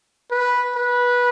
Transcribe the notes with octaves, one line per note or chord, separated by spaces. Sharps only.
B4
B4